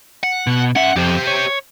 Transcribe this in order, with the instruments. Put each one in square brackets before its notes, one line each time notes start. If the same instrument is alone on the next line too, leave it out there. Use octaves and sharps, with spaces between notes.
[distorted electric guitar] F#5
[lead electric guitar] B2
[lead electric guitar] C#4 E5 [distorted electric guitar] F#5
[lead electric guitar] F2 [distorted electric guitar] G4 C5
[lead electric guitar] C#5